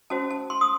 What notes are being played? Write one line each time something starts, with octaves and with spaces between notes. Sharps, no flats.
C#4 F#4 C5 A5
A5
C6
D#6